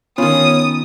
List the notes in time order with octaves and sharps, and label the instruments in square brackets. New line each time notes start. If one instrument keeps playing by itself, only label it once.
[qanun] D#3 F4 [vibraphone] B3 [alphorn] C#4 [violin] D#6